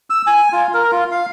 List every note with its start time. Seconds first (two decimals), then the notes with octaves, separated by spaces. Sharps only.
0.10 E6
0.27 G#5
0.52 F4
0.74 A#4
0.92 F4
1.11 F5